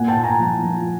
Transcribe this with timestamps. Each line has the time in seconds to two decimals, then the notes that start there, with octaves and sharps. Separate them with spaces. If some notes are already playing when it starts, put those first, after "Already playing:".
Already playing: A#2 F#5 G#5
0.08 G5 A5
0.16 A#2
0.24 G#5 A#5
0.40 F3
0.63 F3